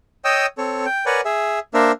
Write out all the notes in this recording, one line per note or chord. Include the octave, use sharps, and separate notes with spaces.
C#5 D#5 G5 D#6 E6
C4 A4 C#5
G5
A#4 B4 C#5 D5 F#5 G#5
G#4 E5
A#3 D4 A#4 C5 E5